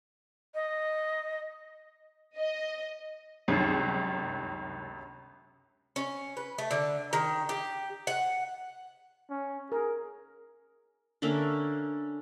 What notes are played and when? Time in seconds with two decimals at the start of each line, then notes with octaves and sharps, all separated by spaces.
0.55 D#5
2.37 D#5
3.48 G1 C#2 F#2 C3 D#3
5.96 C#4
6.37 B4
6.58 A3
6.71 D3
7.13 D#3
7.49 G4
8.07 F#5
9.30 C#4
9.72 G#4 A#4
11.22 D3 A#3 C#4 E5